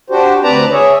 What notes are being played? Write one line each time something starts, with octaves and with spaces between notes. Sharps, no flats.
D4 F#4 G4 C5
D2 C4 B4 D5 A5 A#5
G#4 C#5 E5